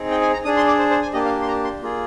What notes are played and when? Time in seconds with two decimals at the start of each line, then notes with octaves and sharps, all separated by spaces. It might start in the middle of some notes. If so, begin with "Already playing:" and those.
Already playing: C4 D#4 G#4
0.11 G5
0.21 G#5
0.33 A#5
0.44 D4 G#4 D#6
0.57 C6
0.67 D5
0.79 C5
0.91 C5
1.02 G#5
1.13 A#3 D4 G4 D#5
1.25 F5
1.42 C6
1.48 A#5
1.64 C6
1.82 A#3 F4 G#4